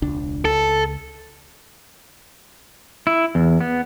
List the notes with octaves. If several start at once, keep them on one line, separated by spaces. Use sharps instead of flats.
E1 C#2 D4
C#2 A4
E4
E2
B3